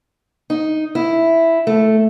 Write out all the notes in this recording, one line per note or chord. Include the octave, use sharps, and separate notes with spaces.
D#4
E4
A3